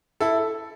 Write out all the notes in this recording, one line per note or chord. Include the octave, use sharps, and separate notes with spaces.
E4 A4